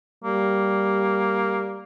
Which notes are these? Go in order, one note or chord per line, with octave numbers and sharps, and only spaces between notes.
G3 A#3